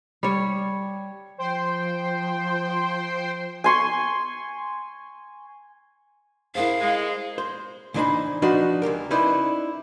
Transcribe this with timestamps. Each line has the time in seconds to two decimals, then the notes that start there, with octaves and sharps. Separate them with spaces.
0.23 G3 C#5
1.38 F3 C5 G5 C6
3.64 G#5 C6 C#6
6.55 D4 E4 G#4 A#4 C5 F5
6.81 G#3
7.38 C5
7.94 C#2 E3 D4 D#4 C5 B5
8.42 F3 D4 D#4 F#4 B4 D#5
8.82 C#2 F#2 G4 A#4
9.11 C#4 D#4 E4 B4 C5 D5